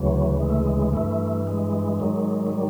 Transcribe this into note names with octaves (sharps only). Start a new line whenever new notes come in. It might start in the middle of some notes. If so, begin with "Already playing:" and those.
Already playing: D2 C#3 E3 F#3
G#3
A3
G#3
G2 E3 A3
G#3
G#2 D#3 F#3
G#3
G3